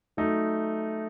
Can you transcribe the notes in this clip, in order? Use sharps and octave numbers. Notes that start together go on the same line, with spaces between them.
F#3 A3 D#4